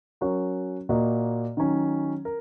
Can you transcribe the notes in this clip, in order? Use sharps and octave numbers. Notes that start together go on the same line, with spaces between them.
F#3 C#4 F#4 A#4 C#5
A#2 A#3 F#4 D#5
D#3 F#3 C#4
A#4